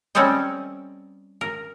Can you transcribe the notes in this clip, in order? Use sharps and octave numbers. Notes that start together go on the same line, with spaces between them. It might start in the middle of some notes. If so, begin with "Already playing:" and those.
G3 C4 C#4 A4 C5 D#5
A#4